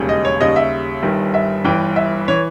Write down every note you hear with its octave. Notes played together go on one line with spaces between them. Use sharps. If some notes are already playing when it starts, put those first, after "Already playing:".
Already playing: E1 D#2 C#3 G3
D#5
C#5
D#2 C#3 G3 D#5
E5
G1 G2 D#3 G3
E5
G1 G2 E3 G5
E5
E3 C#5